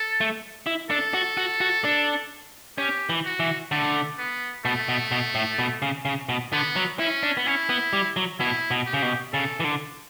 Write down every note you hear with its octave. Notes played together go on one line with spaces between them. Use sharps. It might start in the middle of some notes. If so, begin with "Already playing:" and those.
Already playing: A4
A3
E4
D4 A4
F#4
F#4
F#4
D4
C#4 G4
E3
F#4
E3
D3 A3
B3
B2 A3
B2
B2
A2
B2
C#3
C#3
B2
D3 B3
F#3
C#4 E4
D4
B3
C#4 E4
B3
G3
F#3
B2 E4
B2
G4
C#3
B2
C#3 A4
E3
D3